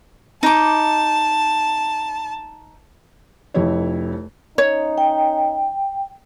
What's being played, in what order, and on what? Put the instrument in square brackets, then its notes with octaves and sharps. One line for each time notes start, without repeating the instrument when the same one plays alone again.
[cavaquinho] D#4 D6 [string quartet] A5
[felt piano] F1 F2 E4 C#5
[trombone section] C#4 D#4 [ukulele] C#5
[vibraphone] G5